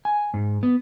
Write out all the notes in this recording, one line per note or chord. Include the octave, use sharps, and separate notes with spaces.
G#5
G#2
B3